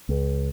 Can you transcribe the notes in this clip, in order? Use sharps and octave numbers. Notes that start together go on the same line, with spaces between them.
C#2